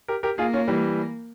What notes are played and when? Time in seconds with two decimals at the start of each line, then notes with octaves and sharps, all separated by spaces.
0.08 G4 A#4
0.23 G4 A#4
0.38 A#3 F4 G#4
0.53 C#4 F4
0.68 E3 G3